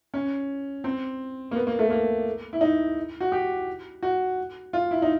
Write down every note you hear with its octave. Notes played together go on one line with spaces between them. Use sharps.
C#4
C4
A#3
B3
A#3
A3
A#3
E4
D#4
F#4
G4
F#4
F4
E4
D#4